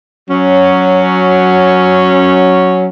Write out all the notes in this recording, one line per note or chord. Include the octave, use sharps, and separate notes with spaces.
F#3 C#4